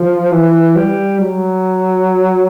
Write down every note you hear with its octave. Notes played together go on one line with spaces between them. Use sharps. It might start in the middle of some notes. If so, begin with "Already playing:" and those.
Already playing: F3
E3
G3
F#3